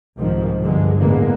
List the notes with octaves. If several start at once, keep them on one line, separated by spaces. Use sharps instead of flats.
C2 G#2 D#3 F3
G1 G2 D3 G#3
A1 E2 D3 G#3 A#3 B3